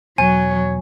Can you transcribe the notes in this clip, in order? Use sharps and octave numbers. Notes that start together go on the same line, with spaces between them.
E2 B2 F#3 C#5 G#5